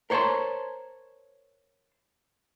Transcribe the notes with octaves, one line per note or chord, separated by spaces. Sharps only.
A#4 C5 C#5 F5 A5 C6